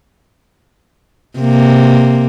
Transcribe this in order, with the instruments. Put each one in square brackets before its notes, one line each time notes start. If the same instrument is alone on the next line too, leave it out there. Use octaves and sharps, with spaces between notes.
[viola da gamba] C3 A#3